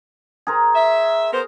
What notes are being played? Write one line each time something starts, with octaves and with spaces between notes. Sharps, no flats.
G#4 A#4 C5
E5
B3 A#4 C5